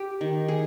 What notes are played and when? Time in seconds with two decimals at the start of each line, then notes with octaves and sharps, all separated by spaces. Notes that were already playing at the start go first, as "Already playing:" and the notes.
Already playing: G4
0.21 D#3
0.48 G#4